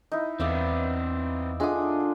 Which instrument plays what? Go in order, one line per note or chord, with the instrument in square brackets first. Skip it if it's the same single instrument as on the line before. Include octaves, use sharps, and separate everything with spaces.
[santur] D#4 E4
[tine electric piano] E2 [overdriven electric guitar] C4 B4 [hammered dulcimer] D5 E5 F5
[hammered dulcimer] D3 D4 F4 [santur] G#4 D#6 [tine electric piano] D#5 E5 F#5